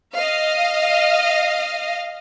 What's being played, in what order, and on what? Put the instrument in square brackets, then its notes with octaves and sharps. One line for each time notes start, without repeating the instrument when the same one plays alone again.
[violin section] D#5 F5